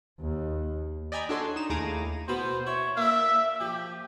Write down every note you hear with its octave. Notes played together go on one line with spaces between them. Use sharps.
D#2
D5 D#5 G5 G#5 A#5 B5
D4 F#4 A4 C#5 C6
D#4 E7
D#2 A2 G#4 A#5 D6 D#7
B2 B3 C5 B5
E4 C#5
A#3 D4 E5
F3 G4